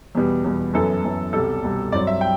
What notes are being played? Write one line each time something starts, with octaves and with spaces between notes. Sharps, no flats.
E2 B2 G3 B3
E2 B2 G3 B3
F#2 E3 B3 A4
F#2 E3 B3
C2 B2 G3 A4
C2 B2 G3
G2 F#3 C4 D5
E5
G5